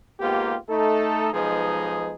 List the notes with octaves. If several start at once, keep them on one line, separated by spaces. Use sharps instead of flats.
G#2 A#3 B3 F4 G4
A3 D#4 A4
B1 F3 G#3 D#4 G#4 B4